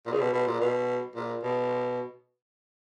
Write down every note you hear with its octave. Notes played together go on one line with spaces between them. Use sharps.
A#2
C#3
B2
B2
A#2
B2
A#2
B2